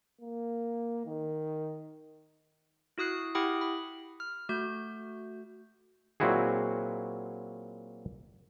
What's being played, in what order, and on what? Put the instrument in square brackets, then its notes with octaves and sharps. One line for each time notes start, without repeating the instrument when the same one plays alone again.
[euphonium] A#3
D#3
[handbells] E4 F#4 D#6 F#6 C7
E4 G4 F#5 G5 B5 D#6
B5
F6
A3 F#4 G6
[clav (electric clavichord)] A#2 F#3 C4 E4 F#4 G#4